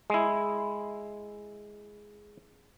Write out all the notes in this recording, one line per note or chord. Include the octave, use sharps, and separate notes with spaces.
G#3 E4